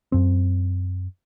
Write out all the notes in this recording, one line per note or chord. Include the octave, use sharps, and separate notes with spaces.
F#2 C4